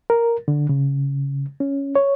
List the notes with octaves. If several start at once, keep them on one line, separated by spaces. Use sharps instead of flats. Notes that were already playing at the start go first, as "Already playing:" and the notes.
A#4
D3
C#3
C#4
C#5